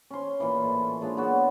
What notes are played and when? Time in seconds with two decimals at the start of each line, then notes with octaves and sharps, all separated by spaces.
0.11 C#4 C6
0.40 A#2 E3
0.64 A2
1.01 A#2 G#3 D4 F4
1.17 F#3 B3 E4 F#4